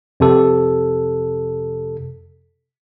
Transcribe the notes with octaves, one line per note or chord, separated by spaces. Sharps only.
F2 C3 A4